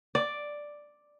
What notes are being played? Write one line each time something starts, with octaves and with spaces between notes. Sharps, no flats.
D5